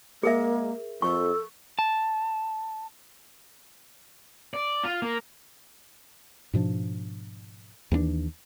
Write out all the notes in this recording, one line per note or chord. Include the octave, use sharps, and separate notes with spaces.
G#3 A#3 G#4 A#4 E5
F2 A4 C#6
A5
D5
F4
A#3
G#2 B2 F3 D4
D#2 E3 A#3 D4